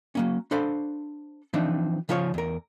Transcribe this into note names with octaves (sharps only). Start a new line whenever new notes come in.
F#3 A#3 C#4
D4 A4 C5 F5 B5
E3 F3 C4 D4 D#4
C#3 F3 F4 C5 C#5
E2 A#4